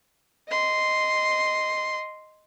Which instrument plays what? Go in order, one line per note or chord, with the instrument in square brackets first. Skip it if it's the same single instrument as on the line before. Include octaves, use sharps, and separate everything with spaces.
[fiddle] D#5 C6